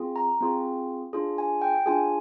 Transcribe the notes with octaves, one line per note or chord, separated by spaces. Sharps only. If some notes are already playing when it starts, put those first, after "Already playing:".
Already playing: C4 F4 G#4
A#5
C4 F4 G#4
D4 F4 G#4
G#5
G5
D4 F4 G#4 G#5